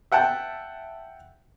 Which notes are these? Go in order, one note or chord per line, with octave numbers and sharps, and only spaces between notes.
E5 F#5 G5 A5